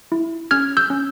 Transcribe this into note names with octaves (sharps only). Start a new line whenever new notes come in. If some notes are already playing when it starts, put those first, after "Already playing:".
E4
C#4 F6 G#6
E6 G6
C#4